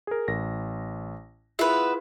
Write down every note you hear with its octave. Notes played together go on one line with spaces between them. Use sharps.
G#4 A#4
A1 A#6
B3 E4 F4 G#4 B4 E5